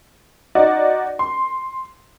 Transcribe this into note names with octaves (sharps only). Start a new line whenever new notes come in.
D#4 F#4 D5
C6